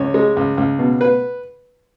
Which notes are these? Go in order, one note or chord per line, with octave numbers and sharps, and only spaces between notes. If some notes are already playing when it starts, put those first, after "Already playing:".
Already playing: C#2 C#5
G#3
C#2
C#2
B2
B4